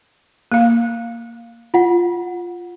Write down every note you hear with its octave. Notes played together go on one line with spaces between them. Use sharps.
A#3 F5
F4 F#5